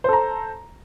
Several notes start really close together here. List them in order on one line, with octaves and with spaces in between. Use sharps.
C5 A4 A#5